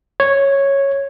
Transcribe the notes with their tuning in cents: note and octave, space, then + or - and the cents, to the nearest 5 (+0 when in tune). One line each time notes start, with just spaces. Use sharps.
C#5 -5